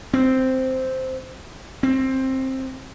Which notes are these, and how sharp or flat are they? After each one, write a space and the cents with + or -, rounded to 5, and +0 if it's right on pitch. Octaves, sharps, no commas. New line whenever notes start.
C4 -5
C4 +15